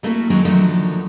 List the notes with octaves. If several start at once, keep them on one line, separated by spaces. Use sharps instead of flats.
G3 A3 A#3 E4 F#4 A4
D#3 F#3 G#3 A#3 D4 D#4
D3 D#3 F3 F#3 A3